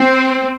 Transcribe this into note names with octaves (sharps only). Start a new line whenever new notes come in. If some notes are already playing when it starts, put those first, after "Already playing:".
Already playing: C4